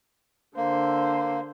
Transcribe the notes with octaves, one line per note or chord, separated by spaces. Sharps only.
D3 A#3 C5